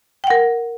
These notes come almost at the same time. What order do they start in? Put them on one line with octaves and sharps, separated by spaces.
G5 F#5 A#4